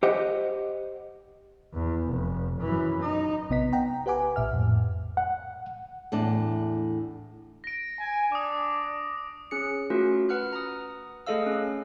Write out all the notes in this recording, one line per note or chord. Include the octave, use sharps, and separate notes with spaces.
G4 C5 D#5 F#5
E2
F1
F#2 E3
D#4
A#1 C3 B3 D#5 B6
F#5 G5 A#5
G4 B4 F#5 G#5 D6
A#1 A#2 E5 F6
F2 A2
F#5
E2 A2 D4
A#6 D7
G#5
D4 D6 D#6
C#4 G#4 C#7
A3 C#4 F4 F#4 A#4
B4 F#5 F6 F#6
A#5 D#6
A3 G#4 A4 D#5 F5 E6
C#4